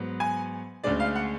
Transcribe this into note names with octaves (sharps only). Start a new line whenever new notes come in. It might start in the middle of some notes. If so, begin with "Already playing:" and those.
Already playing: G#2 F#3 B3
G#5
D2 C#3 G#3 D5
F5
F#5